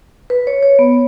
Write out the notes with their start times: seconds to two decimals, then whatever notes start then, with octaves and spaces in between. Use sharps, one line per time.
0.30 B4
0.47 C#5
0.63 C#5
0.79 B3